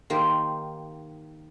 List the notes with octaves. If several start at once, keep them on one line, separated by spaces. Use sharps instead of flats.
D#3 A#3 G4 C5